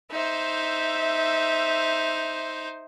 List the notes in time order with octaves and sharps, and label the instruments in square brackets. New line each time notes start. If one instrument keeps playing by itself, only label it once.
[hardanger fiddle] D#4 C5 [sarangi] E5